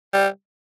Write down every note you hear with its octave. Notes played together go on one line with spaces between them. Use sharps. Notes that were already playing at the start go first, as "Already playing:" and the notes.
G3